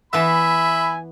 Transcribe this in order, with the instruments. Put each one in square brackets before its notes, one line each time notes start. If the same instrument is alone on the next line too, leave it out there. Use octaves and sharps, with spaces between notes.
[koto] E3 B3 [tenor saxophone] E5 [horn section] G#5 B5